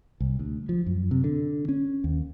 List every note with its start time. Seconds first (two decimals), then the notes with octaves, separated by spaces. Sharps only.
0.20 C2
0.39 D2
0.69 F3
0.86 F#2
1.11 C3
1.24 D3
1.69 C#4
2.04 D#2